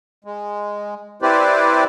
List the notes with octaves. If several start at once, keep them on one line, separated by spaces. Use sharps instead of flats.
G#3
C4 E4 G4 B4 C5 D5